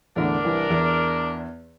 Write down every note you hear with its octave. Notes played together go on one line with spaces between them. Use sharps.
E2 A2 D3 D4 A#4
C2 E3
E2